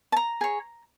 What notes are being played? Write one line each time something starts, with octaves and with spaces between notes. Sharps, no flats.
A5
A#5
G#4 C#5